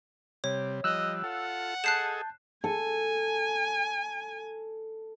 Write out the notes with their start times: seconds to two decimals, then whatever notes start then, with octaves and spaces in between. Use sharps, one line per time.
0.44 C3 G3 C#5
0.84 F3 G3 D#5 E6 F#6
1.23 F4 A4 F#5
1.84 G#4 A4 D#5 A5 F#6 G6 C7 E7
2.64 A4 G#5